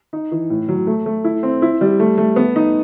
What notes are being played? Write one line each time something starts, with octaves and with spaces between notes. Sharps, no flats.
D#4
E3
A2
F#3
A3
A3
E4
C4
E4
G3
A3
A3
B3
D#4